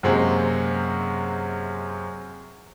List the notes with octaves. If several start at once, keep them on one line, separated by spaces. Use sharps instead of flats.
F#2 C3 G#3 A#3 C4